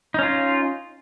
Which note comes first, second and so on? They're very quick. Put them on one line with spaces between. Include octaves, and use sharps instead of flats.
D#4 C#4 F4